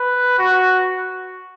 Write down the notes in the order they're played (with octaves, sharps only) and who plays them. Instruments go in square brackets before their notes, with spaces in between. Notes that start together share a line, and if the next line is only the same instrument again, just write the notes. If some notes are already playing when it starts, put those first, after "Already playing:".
Already playing: [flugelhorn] B4
F#4